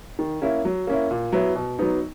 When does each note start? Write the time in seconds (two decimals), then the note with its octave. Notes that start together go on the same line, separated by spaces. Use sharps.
0.19 D#3
0.42 A#3 C#4 E4
0.65 F#3
0.87 A#3 C#4 E4
1.11 A#2
1.33 F#3 B3 E4
1.55 B2
1.79 F#3 B3 D#4